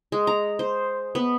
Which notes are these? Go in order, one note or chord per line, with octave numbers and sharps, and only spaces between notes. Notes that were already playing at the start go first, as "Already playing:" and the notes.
G#3
A#5
C5
B3